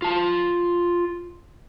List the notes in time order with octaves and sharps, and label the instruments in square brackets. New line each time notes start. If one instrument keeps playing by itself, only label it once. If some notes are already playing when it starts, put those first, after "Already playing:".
[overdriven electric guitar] F4 A5